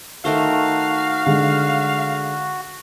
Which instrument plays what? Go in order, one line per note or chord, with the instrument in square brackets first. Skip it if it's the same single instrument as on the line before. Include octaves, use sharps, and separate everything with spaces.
[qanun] D#3 A3 C5 [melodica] F#4 [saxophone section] F5
[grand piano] D3 G#3